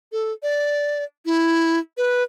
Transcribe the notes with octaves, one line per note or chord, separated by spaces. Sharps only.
A4
D5
E4
B4